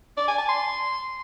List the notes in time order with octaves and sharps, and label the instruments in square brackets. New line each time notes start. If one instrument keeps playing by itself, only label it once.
[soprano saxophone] D5
G#5
A5
C6